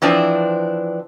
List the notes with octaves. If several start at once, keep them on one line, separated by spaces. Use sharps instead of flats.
E3 F3 C4 D4